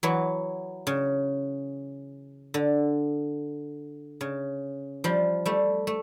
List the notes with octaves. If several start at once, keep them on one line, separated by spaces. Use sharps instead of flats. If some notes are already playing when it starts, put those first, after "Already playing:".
E3 F#3
C#3
D3
C#3
F3 G3
G3 A3
A3